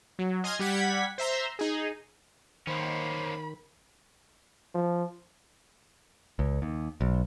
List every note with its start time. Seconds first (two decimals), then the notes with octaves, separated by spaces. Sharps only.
0.19 F#3
0.44 D#5 G#5 C6 D#6 F6 G#6
0.59 G3 G4 F#5 G#6 B6
1.18 C5 E5 A#5 C6
1.59 D#4 G#4
2.67 D#3 A#3 C#4 C5 B5
4.75 F3
6.39 C#2
6.62 D#2
7.01 B1